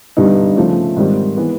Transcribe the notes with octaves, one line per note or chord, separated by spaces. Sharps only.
G2 D3 G3 B3 D#4
C#3 F3 A3
G#2 D#3 G3 C4
E3 G#3 B3